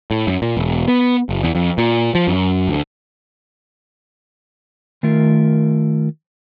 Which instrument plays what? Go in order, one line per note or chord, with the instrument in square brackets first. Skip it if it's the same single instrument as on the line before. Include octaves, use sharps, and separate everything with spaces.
[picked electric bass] A2
F#2
A#2
E1
B3
F#1
E2
F2
A#2
F3
F#2
D2
[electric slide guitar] D#3 A3 F4 A#4